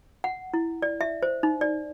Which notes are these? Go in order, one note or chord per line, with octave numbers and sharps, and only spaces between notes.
F#5
E4
D5
E5
C5
D#4
D5